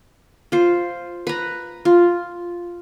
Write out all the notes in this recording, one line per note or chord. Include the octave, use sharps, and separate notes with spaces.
F4 C5
B4 A#5
F4